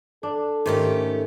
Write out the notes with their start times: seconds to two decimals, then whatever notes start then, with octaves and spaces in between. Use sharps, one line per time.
0.23 D4 A4
0.66 G#2 D#3 A3 C#4 G4